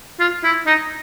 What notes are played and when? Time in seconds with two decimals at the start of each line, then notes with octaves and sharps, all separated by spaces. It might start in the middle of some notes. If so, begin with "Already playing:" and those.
0.20 F4
0.44 E4
0.66 D#4